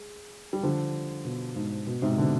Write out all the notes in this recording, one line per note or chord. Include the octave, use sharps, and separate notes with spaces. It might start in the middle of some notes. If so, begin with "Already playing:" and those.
Already playing: G#3
G3
D3 F3
B2
G#2
B2
G#2 C3
B2 D3